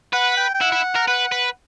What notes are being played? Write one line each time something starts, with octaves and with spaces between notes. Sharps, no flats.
B4 F#5
G5
G5
E4 F#5
E4
A#4
B4 F#5
B4